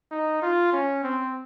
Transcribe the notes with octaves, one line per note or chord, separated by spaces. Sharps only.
D#4
F4
C#4
C4